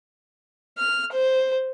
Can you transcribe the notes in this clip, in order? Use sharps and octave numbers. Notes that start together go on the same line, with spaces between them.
F6
C5